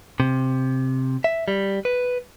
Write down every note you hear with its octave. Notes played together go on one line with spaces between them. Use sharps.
C3
E5
G3
B4